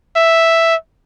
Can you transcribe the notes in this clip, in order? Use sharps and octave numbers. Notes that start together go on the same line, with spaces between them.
E5